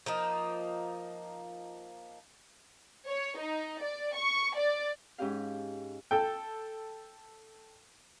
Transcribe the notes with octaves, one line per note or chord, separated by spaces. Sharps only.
F3 A#3 D#4
C#5
D#4
D5
C#6
D5
G#2 C#4 G4 F5
A4 G5